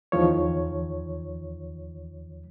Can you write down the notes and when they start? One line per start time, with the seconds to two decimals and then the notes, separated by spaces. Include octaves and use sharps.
0.12 E2 D#3 F3 C#5